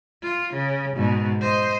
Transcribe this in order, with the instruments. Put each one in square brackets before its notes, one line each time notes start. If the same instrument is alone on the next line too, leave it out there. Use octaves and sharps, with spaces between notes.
[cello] F4
C#3
G#2 B2
C5 D#5